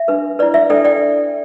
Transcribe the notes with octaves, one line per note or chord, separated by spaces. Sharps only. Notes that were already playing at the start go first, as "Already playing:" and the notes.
Already playing: E5
D4 B4
E4 B4 D5
E5
D4 A4 D5 G5
D5 G5